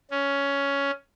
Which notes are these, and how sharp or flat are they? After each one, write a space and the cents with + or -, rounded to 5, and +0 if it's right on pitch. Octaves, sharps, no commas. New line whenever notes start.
C#4 +10